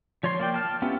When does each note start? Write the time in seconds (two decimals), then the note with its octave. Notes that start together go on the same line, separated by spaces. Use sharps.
0.23 F3 C#5 D5 C6
0.39 A#3 D5 G5
0.54 A5 F6
0.82 B3 C#4 E4 F4 G4